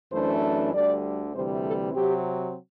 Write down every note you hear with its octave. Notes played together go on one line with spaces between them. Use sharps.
F#2 E3 A3 D4 C5
D2 D3 G3 D5
D2 C3 E3 G3 C5
A4
C3 F#3 C4 G4